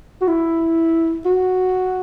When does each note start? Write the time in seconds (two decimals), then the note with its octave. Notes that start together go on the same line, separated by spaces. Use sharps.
0.21 F#4
0.28 E4
1.26 F#4